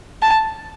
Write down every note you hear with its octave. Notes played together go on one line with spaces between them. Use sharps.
A5